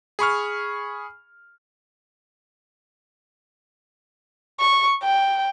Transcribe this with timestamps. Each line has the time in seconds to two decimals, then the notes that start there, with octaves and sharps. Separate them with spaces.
0.19 G#4 B5 C#6 F6
4.60 C#6
5.03 G5